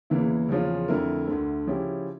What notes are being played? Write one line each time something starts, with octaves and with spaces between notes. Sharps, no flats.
E2 C#3 E3 A#3 E4
E2 C#3 F3 C#4 F4
F2 D3 A3 E4 A#4
D2 D3 A3
C#3 F3 C#4 E4 G4